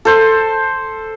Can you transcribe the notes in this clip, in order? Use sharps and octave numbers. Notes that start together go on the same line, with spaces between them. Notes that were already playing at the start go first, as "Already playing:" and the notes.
A4 C5